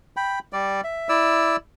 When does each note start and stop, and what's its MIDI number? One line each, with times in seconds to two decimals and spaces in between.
0.17 0.39 79
0.17 0.39 83
0.53 0.81 55
0.53 0.81 74
0.84 1.08 76
1.09 1.56 64
1.09 1.56 74
1.09 1.56 88